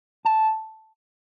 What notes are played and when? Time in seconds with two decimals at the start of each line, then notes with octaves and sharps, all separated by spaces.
0.25 A5